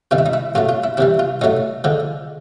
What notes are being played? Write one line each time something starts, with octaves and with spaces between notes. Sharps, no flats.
C3 D#3 G3 F4
E4
D#4
E4
A2 F#3 A3 F4
F4
E4
C3 E3 G3 E4
F4
A2 F#3 A3 D#4
D3 F3 G#3